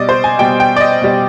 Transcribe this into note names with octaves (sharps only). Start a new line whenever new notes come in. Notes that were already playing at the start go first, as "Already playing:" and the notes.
Already playing: B2 G3 D5 D#5
C5
G#5
B2 G3 G5
G5
D5
D#5
B2 G3